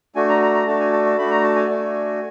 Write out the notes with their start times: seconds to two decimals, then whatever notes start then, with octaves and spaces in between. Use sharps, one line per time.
0.15 A3 D4 F#4 G#5
0.29 A#5
0.42 A#5
0.54 A#5
0.67 A3 D4 F#4 A5
0.80 G#5
0.93 A5
1.06 A5
1.17 A3 D4 F#4 B5
1.31 A#5
1.44 A5
1.56 G#5
1.69 A3 D4 F#4